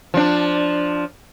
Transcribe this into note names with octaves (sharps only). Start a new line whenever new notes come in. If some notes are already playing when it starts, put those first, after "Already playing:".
F3 D4